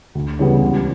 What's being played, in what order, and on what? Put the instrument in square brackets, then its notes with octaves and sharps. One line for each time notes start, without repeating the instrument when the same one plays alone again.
[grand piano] D2
C#3 E3 G3 B3
C#2